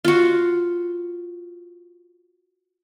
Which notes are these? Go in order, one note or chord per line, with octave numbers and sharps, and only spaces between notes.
F4 F#4